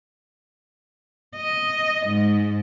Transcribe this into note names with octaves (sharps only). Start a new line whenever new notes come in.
D#5
G#2